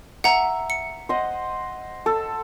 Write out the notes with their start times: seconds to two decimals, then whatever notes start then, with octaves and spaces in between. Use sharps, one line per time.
0.24 E5 F#5 A#5
0.70 C#7
1.09 C5 D#5 F#5
2.06 A4